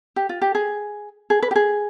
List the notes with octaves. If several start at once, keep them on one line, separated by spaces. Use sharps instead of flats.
G4
F4
G4
G#4
G#4
B4
G4
G#4